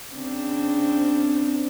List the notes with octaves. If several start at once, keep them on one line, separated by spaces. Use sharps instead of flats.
C#3 C4 D4